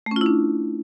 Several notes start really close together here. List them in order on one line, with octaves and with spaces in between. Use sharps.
A3 C#4 F4 E4 D4